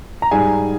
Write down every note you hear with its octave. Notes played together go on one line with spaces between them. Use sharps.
A#5
G#2 G3 G#4 G#5